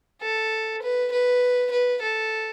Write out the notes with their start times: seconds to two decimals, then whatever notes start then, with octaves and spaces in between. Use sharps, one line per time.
0.22 A4
0.82 B4
1.12 B4
1.72 B4
2.02 A4